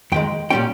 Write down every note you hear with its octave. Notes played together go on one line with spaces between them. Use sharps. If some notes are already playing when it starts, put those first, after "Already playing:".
F2 D#3 G#3 G5
A#2 G3 C#4 G5